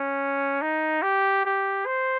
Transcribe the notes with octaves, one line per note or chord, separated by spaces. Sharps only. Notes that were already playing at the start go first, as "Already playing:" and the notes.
Already playing: C#4
D#4
G4
G4
C5